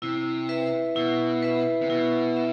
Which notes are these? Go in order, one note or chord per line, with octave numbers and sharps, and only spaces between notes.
C3 E4
B4 E5
B2 E4
B4 E5
C3
B2 E4
E5